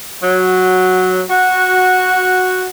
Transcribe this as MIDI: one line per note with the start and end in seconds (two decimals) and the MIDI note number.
0.22 1.22 54
1.29 2.67 66